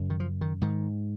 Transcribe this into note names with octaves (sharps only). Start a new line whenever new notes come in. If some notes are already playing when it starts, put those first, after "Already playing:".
Already playing: F#2 C#3
D#3
F3
D#3
G#2 D#3